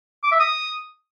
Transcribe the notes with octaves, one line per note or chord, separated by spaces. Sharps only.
D6
E5
D#6